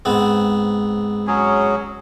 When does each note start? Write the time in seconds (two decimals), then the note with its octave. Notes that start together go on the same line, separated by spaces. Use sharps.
0.05 G#2 B3 C4
1.27 F#3 C#4 G#4